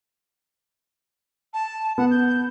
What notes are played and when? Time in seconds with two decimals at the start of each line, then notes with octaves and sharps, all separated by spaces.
1.54 A5
1.98 B3 F#5
2.11 G6